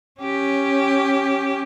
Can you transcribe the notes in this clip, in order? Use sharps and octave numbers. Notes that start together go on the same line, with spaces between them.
C#4 G4